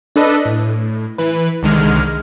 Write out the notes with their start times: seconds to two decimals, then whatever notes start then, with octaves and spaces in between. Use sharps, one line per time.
0.16 D4 A4 B4 D#5
0.45 A2
1.18 E3 B4
1.63 C2 D3 D#3 G#3 F6